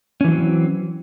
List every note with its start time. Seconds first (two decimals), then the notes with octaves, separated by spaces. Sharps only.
0.21 C#4
0.24 E3
0.28 F#3
0.32 C4